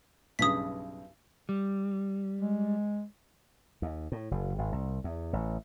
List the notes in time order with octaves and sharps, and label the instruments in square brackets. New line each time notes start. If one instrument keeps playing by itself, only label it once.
[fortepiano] B1 G2 C#3 [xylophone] D#6 B6
[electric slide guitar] G3
[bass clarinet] G#3
[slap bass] D#2
A2
F#1
G#1
C2
E2
A1